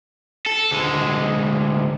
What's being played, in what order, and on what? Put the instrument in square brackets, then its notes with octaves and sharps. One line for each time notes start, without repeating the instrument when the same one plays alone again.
[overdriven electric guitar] A4
D2 G#3